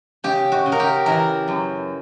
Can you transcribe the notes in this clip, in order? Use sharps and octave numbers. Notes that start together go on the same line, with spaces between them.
C#3 G4
F#4
C#3
A#4
G4
E3 A#4
F#2